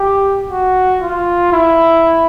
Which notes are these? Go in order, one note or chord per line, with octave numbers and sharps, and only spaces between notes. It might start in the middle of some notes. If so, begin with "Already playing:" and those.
Already playing: G4
F#4
F4
E4